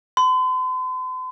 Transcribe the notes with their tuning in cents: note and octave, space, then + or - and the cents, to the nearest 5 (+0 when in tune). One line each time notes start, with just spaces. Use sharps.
C6 -45